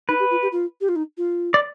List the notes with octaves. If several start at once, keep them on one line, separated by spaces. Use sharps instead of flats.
D#4 B4
G4
F4
G4
F4
G4
F4
D#4
F4
D5